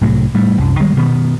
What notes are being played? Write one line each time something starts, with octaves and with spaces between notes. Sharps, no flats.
C2 A2 F#3
A2 G3 A3
C2 F#2
D#3 G3 G#3
B2 D#3 B3